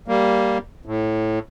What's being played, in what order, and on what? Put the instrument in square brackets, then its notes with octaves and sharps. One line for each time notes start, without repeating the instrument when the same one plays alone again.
[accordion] G3 A#3
A2